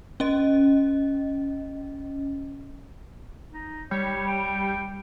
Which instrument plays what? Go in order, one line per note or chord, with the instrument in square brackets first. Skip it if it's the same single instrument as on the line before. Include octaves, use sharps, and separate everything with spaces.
[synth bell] C#4 D#5
[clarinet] D#4
[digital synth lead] G3 [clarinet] C#5
[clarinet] G5